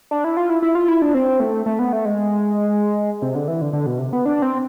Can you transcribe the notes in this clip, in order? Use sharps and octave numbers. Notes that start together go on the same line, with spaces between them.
D4
E4
F4
E4
E4
F4
E4
D4
C4
A3
A3
B3
A3
G#3
C3
D3
E3
D3
D3
B2
C3
B3
D4
C4